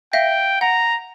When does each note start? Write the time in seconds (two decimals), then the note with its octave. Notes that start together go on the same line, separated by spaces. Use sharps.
0.13 E5 F5 G5 A#6
0.61 F#5 A#5